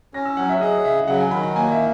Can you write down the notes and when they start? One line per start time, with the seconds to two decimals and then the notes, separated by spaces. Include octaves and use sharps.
0.14 C#4 A#6
0.26 E6
0.37 F#3 F#5
0.49 E5
0.61 G#4 D#5
0.85 C#3 E5
1.08 F#3 F#5
1.20 G#5
1.31 D#3 B5
1.43 A#5
1.55 A#3 G#5
1.72 E5